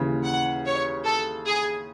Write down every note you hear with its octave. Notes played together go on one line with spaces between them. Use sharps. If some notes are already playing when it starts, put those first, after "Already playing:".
Already playing: D#2 C#3 E3
F#5
C#5
A4
G#4